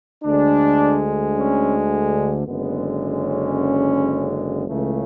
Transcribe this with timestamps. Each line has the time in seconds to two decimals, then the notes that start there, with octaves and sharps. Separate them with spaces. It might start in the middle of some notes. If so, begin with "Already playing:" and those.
0.24 D2 D3 G#3 D4
1.35 C#4
2.46 F#1 F#2 D3 G#3 B3
3.01 C#4
4.68 C#2 C#3 E3 A3